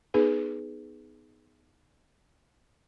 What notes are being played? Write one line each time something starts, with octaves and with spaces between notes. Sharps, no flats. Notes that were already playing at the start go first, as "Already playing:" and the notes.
B3 D#4 G#4 B4